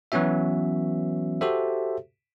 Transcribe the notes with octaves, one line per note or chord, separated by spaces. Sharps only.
E3 F#3 B3 C#4 F#4 E5
F#4 G4 A4 C5 E5